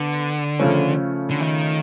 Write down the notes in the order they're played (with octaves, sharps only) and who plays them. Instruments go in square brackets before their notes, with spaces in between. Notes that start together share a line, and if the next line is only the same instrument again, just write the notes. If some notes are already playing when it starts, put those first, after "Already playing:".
Already playing: [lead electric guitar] D3 [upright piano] B3
[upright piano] C#3 F3 A3 C#4
[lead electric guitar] D3
D#3